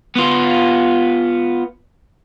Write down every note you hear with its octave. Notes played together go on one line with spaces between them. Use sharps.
B3 F4